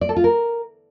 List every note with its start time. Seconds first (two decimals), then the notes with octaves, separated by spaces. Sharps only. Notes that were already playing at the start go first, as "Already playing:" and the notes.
0.01 D5
0.09 A4
0.16 F4
0.24 A#4